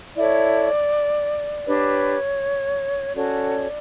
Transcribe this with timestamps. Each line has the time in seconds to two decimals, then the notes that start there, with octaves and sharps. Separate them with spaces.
0.16 E4 A4 C#5 D5
1.65 D4 G4 B4 C#5
3.14 C#4 F#4 A4 C#5 D5